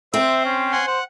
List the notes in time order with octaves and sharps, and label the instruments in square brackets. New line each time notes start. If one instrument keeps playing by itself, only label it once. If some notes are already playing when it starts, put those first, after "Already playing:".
[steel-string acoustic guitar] C4 [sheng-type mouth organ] C5 [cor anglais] E5
[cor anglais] C#4
[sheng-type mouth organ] F#5 G#5 C6
[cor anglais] C5 [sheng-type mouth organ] F#5